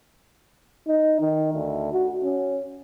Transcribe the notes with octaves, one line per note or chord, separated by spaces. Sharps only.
D#4
D#3
D2
F#4
C#4